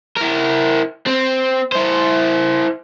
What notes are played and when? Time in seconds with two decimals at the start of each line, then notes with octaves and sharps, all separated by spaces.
0.17 E4 A#4
1.07 C4
1.72 E4 C5